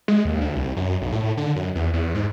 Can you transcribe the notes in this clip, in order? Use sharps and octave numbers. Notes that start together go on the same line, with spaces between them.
G#3
D#2
D2
C2
F#2
B1
A2
D3
F#2
E2
E2
G#2